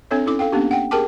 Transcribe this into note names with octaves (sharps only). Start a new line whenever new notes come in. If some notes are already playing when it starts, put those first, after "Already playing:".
C4 D4 A4 C#5 E5
C#4 E4 A4 D6
A4 F5 G5
A#3 B3 C#4 D4 G4
F#5 G5
G4 G#4 A#4 G5 A5 D6